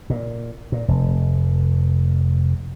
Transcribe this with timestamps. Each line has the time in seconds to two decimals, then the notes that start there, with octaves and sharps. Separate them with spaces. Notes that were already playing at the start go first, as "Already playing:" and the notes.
0.10 A#2
0.72 A#2
0.88 F1